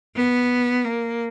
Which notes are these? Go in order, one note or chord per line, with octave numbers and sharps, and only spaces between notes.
B3
A#3